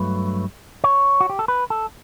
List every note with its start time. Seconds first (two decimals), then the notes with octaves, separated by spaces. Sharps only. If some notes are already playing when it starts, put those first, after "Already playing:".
Already playing: G2 F#3 A3 B4
0.84 C#5
1.21 F#4
1.30 G4
1.39 A4
1.48 B4
1.70 A4